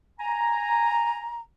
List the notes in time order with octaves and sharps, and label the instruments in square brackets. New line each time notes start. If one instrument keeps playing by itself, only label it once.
[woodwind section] G#5 A#5